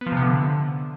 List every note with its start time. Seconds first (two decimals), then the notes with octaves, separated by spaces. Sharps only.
0.01 B3
0.06 F3
0.12 C3
0.17 B3
0.22 D3